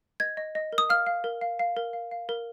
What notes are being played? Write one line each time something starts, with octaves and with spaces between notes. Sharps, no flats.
D#5 G#6
D#5
D#5
A#4
D#6
F5 F6
F5
A#4
F5
F5
A#4
F5
F5
A#4